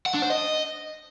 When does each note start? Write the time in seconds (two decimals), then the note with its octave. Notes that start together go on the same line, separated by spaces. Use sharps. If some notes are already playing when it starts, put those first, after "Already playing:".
0.06 F#5
0.14 D4
0.22 C5
0.30 D#5